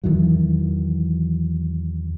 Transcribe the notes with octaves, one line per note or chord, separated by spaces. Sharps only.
E2 D#3 E3 F#3